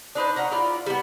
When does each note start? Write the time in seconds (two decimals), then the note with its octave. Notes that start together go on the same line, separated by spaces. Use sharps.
0.15 D4 D#4 B4 C5
0.36 C#4 F#5 A#5
0.51 E4 F4 D5
0.86 G3 B3